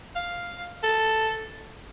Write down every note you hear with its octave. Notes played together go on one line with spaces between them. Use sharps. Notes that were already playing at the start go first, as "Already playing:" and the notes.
F5
A4